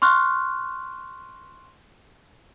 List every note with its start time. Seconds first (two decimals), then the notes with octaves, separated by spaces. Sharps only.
0.02 C6 C#6 F6 F#6